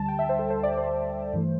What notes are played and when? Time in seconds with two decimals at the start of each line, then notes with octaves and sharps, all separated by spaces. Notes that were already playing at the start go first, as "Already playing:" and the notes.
Already playing: D2 D3 G3 A5
0.08 G5
0.19 E5
0.29 C5
0.39 A4
0.50 C5
0.63 D5
0.78 C5
1.33 G2 E3 A3